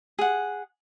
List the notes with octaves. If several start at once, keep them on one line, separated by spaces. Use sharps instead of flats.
G#4 F#5